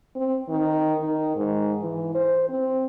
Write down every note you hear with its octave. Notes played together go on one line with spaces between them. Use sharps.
C4
D#3
D#3
G#2
E3
C5
C4